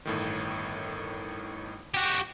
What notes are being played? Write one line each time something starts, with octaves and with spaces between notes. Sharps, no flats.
G1 A2 D#3
F#4 G4